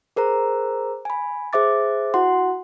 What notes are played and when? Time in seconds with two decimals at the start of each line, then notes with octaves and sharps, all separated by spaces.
0.16 G#4 A#4 C5 A#5
1.05 G#5 B5
1.53 G#4 C5 E5 D6 A6
2.14 E4 F#4 F#5 C6